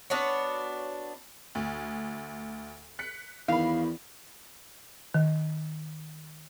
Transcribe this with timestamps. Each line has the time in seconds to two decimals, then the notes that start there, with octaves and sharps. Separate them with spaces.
0.10 B3 D4 F#4 C#5
1.55 D2
2.99 F#6 B6 C#7
3.48 E2 D#3 F5 B5
5.14 D#3